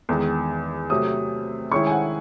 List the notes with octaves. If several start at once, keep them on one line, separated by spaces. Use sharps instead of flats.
E2 D#3 G#3
C3 F#3 A3 C4 D#6
D#3 G#3 C#4 E4 C#6
G#5
F#5